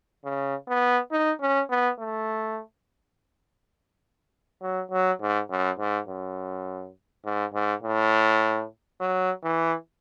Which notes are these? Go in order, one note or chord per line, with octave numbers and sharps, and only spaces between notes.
C#3
B3
D#4
C#4
B3
A3
F#3
F#3
G#2
F#2
G#2
F#2
G#2
G#2
A2
F#3
E3